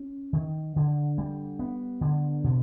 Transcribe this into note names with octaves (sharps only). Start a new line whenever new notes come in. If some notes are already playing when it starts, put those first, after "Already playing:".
Already playing: C#4
D#3
D3
G3
B3
D3
B2